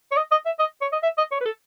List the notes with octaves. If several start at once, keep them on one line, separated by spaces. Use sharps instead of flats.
C#5
D#5
D#5
E5
D#5
C#5
D#5
E5
D#5
C#5
B4
A4